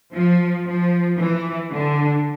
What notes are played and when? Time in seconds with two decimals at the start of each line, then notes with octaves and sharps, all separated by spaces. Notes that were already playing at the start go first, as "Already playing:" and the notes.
0.14 F3
0.65 F3
1.17 E3
1.70 D3